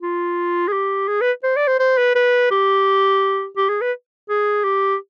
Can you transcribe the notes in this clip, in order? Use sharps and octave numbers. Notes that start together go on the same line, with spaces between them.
F4
G#4
G4
G#4
B4
C5
D5
C5
C5
B4
B4
G4
G4
G#4
B4
G#4
G4